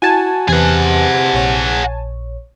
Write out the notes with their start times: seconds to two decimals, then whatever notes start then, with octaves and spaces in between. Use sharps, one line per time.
0.02 E4 F#4 G#5 A5
0.48 E2 C3 G#4 B4 F#5
1.33 A#1 C#5